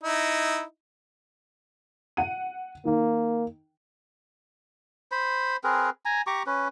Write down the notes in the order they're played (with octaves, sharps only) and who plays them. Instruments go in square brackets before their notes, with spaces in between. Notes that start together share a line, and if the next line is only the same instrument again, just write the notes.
[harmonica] D#4 E4
[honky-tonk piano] F#5 D#7
[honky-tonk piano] D#3 [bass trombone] A#3
[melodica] C5 B5
C4 G#4 A#4 B4
G#5 A#5
G4 A#5 C#6 D6
C#4 B4